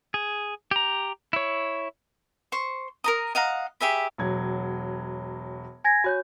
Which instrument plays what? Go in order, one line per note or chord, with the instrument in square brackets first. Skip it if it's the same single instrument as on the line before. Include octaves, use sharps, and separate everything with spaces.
[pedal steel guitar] G#4
G4 A#5
E4 C#5
[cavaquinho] C5 C#6
A#4 A#5 D#6
D#5 F5 F#5 A#5
G4 G#4 E5 B5
[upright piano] E1 F#3 G#6
[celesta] G#5 G#6 A#6
[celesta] F#4 C#5 G6 [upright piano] G#5